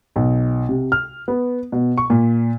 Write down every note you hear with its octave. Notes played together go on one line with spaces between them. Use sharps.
B1
C3
F6
B3
B2
C#6
A#2